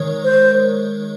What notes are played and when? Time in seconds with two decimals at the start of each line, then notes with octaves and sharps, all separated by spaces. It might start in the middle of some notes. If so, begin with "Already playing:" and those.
Already playing: D#3 G#3 A#4 C#5
0.24 C5